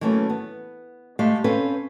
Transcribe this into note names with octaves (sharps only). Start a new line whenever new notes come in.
E3 F#3 A3 A#3 C#4 B4
B3
G#3 A3 G4 E5 F5
C4 C#4 A4 B4 C5 F5